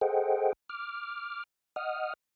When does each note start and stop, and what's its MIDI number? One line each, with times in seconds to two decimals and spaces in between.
0.01 0.53 68
0.01 0.53 69
0.01 0.53 72
0.01 0.53 75
0.01 0.53 78
0.01 0.53 79
0.69 1.44 86
0.69 1.44 89
1.76 2.14 75
1.76 2.14 78
1.76 2.14 87
1.76 2.14 89